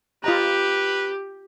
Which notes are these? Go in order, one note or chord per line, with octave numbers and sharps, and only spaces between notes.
F4 G4 B4 D#5 A#5